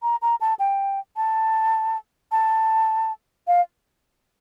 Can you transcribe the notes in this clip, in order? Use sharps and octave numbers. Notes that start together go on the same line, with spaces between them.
A#5
A#5
A5
G5
A5
A5
F5